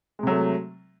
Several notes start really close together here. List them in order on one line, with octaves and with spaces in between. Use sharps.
G#3 C3 F#3 A3